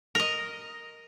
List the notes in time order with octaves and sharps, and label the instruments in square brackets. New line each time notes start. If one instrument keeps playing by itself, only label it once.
[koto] A#4 D#5